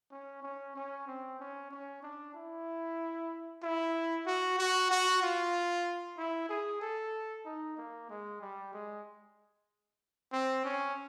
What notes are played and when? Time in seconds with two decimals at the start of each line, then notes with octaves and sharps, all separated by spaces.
0.11 C#4
0.43 C#4
0.75 C#4
1.07 C4
1.39 C#4
1.71 C#4
2.03 D4
2.34 E4
3.62 E4
4.26 F#4
4.58 F#4
4.90 F#4
5.22 F4
6.17 E4
6.49 G#4
6.81 A4
7.45 D#4
7.77 A#3
8.09 G#3
8.41 G3
8.73 G#3
10.32 C4
10.64 C#4